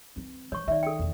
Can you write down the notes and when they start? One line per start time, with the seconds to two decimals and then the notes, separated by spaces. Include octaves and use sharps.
0.16 E3 C4
0.52 E3 C#5 C#6
0.68 D#3 D5 E5
0.83 A4 G5
0.99 E2 D#3